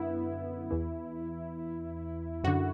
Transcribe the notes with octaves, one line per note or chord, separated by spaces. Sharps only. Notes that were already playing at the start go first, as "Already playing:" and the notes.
Already playing: F#2 D3 B3 E4
E2 E3
F#2 D3 F#4